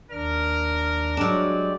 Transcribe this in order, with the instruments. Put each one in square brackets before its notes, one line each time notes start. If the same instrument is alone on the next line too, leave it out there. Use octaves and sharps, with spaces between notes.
[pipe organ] D#2 D4 F6 [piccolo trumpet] A#4
[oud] F#3 D4 [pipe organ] G#3 G4 D5